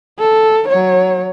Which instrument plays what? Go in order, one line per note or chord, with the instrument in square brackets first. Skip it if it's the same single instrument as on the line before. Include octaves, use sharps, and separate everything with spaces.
[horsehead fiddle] A4
F#3 C#5